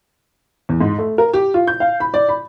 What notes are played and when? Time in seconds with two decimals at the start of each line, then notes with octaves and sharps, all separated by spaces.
0.69 E2
0.81 G#2
0.98 A3
1.18 A#4
1.33 G4
1.54 F4
1.67 G6
1.80 F5
2.00 B5
2.14 D5
2.29 B5